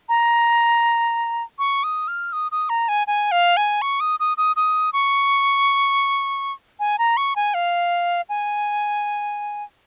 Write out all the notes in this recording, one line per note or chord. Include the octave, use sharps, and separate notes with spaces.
A#5
C#6
D#6
F6
D#6
D#6
A#5
G#5
G#5
F5
G#5
C#6
D#6
D#6
D#6
D#6
C#6
G#5
A#5
C#6
G#5
F5
G#5